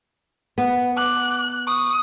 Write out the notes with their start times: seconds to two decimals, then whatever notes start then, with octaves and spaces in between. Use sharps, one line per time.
0.58 B3 B4
0.97 D6 F#6
1.67 C#6 D#6